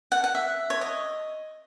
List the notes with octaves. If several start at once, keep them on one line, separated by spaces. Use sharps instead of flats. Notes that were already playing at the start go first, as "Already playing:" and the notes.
F#5
F#5
E5
C#5
D#5